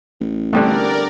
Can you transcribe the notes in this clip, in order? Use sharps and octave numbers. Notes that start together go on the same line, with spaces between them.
A1
D3 G3 A3 B3 C4 D4 A#4 D5